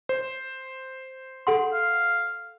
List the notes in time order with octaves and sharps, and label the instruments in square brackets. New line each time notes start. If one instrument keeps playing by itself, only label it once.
[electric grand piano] C5
[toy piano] A4 F#5 C6
[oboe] F5